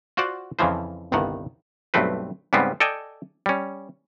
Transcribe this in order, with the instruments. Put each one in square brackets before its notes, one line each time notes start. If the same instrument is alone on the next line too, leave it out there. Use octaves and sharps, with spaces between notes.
[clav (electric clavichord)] F4 F#4 C5 D5 F#5
F2 C#3 E3 F3 C5
G1 C2 G2 D#3 F#5
B1 G2 A3 C4 B4
G#2 C#3 G3 B3 C4
A4 D5 D#5 G5 G#5
G3 C#4